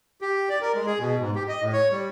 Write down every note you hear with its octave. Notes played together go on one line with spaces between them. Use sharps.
G4
D5
A#4
G#3
G#4
B2
G#2
G4
D#5
A2
C#5
G3